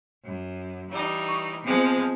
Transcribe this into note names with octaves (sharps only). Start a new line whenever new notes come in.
F#2
E3 G3 D#4
C#6
F3 G#3 B3 C4